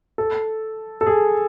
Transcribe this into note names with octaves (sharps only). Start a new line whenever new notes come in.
A4
A4
G#4